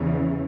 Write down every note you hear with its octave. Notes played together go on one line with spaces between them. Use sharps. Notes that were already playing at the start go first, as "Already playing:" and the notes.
Already playing: E2 C#3 E3